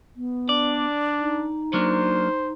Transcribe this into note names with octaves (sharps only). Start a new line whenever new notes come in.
B3
D4 D5
D#4
F#3 A#3 D4 C5